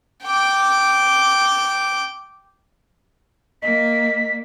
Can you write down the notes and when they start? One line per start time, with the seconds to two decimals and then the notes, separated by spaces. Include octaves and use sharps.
0.25 G5 D6
3.62 A#3 D#5 B6